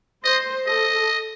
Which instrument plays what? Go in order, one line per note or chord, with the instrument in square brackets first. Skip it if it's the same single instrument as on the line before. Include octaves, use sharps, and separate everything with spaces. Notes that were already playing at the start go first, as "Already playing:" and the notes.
[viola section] C5 [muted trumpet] D#5
[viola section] A4 [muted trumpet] D#5